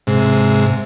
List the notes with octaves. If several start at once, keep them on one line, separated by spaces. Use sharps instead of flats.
G#2 C3